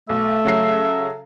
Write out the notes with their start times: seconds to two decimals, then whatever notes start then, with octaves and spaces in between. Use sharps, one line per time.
0.09 B1 A3 A4 E5
0.45 C#3 F#3 C7